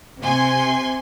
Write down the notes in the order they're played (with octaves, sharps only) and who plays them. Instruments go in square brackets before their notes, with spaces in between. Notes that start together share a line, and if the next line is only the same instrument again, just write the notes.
[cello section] C3 [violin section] C4 G#5 C6